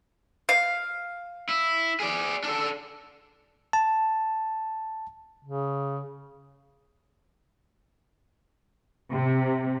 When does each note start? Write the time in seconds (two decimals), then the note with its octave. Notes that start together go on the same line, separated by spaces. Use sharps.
0.49 F5
1.49 E4
2.00 G#4 D5
2.43 D4 A4
3.73 A5
5.44 C#3
9.12 C3